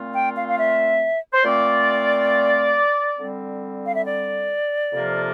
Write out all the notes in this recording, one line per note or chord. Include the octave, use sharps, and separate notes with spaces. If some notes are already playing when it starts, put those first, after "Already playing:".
Already playing: A#2 A3 C4 F4
G5
F5
F5
E5
C5
A#2 A3 C4 F4 D5
D3 G3 C4
F5
E5
D5
F2 C3 F3 A#3 F4